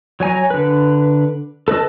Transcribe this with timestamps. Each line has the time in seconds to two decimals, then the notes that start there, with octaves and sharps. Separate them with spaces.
0.20 F#3 C#5 G#5 A#5
0.50 D3 B4
1.68 A4 B4 D#5 A5